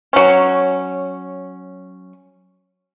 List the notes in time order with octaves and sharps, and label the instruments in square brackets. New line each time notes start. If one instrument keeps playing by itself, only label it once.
[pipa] F#3 C#4